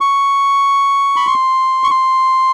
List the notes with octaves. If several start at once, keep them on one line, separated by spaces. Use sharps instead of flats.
C#6
B5
C6
C#6
C6